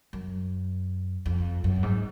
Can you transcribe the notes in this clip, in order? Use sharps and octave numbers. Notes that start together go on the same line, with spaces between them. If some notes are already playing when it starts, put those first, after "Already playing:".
F#2
F2
F#2
G#2